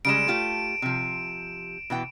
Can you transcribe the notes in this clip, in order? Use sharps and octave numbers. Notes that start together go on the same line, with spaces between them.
C#3 G3 G#3 D7 E7
A3 F4 G4
C3 F3
B2 E3 G5